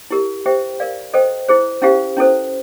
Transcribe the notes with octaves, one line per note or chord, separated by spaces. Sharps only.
E4 G4 A#4
G4 C5 E5 G5
A#4 D5 F5
A4 C5 D#5 G5
E4 G#4 C5
C#4 E4 G4 C5 F5
C#4 E4 A4 C5